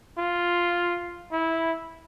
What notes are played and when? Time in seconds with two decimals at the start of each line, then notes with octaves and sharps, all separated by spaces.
0.18 F4
1.32 E4